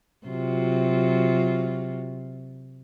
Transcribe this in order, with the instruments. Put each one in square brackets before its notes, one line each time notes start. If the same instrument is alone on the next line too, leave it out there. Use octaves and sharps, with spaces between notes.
[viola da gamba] C3 F#3 F4